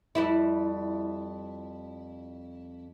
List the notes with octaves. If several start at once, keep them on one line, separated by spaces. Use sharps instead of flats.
F2 G3 E4